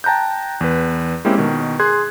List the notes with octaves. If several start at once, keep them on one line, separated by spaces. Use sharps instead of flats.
G5 A5 A#5 F#6 G6
E2 B4
G#3 A#3 C4 C#4 E4 G4
B2 D#3
G#4 C6 F#6 G#6